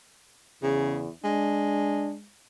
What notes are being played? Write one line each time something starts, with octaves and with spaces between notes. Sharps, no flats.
E2 C#3
G#3 D4